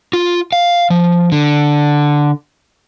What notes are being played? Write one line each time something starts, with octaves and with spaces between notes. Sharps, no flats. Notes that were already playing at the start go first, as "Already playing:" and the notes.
F4
F5
F3
D3